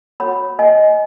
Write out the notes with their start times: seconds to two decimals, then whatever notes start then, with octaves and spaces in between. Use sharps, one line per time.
0.20 F#4 C#5 F#5 B5
0.59 D#5 G#5